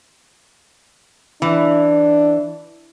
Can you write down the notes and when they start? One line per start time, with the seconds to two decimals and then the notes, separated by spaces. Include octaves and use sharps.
1.42 E3 D4